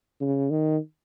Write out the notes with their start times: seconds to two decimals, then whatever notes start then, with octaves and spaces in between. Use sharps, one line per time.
0.21 C#3
0.50 D#3